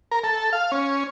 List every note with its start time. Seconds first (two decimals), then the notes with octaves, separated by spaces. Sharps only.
0.11 A#4
0.24 A4
0.53 F5
0.72 C#4